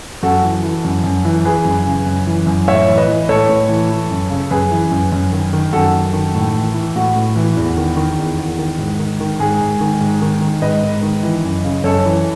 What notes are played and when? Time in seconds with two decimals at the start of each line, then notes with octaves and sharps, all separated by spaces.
0.23 F#2 F#4 A4
0.43 E3
0.63 E3
0.85 F#2
1.04 F#2
1.25 E3
1.45 E3 G#4 B4
1.65 F#2
1.86 C#3
2.06 F#2
2.27 E3
2.47 F#2
2.67 A2 C#5 E5
2.87 E3
2.97 B4 D#5
3.08 E3
3.29 A2 A4 C#5
3.49 A2
3.69 E3
3.90 E3
4.10 F#2
4.30 C#3
4.51 F#2 G#4 B4
4.71 E3
4.92 F#2
5.12 F#2
5.32 D#3
5.53 D#3
5.73 F#2 F#4 A4
5.93 F#2
6.13 D#3
6.35 A2
6.55 E3
6.75 E3
6.96 A2 F#4
7.16 A2
7.36 E3
7.57 E2
7.77 D#3
7.97 D#3
8.18 E2
8.38 E2
8.59 D#3
8.78 G#2
8.99 D#3
9.20 D#3
9.39 G#2 G#4
9.61 G#2
9.81 D#3
10.01 G#2
10.22 D#3
10.41 D#3
10.62 G#2 B4 D#5
10.83 G#2
11.03 D#3
11.23 E3
11.44 F#2
11.65 C#3
11.84 F#2 A4 C#5
12.05 E3